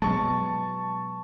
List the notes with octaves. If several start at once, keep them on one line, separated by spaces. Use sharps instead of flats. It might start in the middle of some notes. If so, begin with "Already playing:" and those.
B2 F#3 G#3 A5 C#6